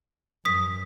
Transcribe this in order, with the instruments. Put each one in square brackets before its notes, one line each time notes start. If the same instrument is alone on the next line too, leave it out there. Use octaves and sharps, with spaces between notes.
[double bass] F#2 [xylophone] D#6 B6